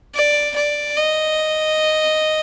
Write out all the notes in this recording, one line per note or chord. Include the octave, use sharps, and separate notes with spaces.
D5
D5
D#5